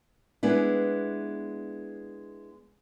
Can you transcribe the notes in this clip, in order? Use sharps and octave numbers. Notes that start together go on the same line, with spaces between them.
G#3 B3 D4 E4